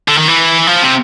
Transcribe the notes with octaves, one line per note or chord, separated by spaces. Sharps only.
D3
D#3
E3
F3
C3